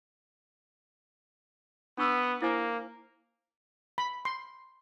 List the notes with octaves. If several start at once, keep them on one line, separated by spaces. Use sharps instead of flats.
B3 D4 C#6 E6
A#3 E4 C5 G#5
B5
C6